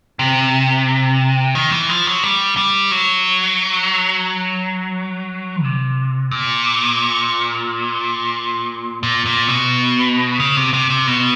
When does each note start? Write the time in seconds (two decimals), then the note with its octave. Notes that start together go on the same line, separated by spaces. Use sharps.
0.19 C3
1.55 D#3
1.72 E3
1.89 F3
2.06 F#3
2.23 G3
2.57 G3
2.91 F#3
5.63 C3
6.31 A#2
9.03 A#2
9.26 A#2
9.49 B2
10.40 C#3
10.56 C3
10.73 C3
10.90 C3
11.07 B2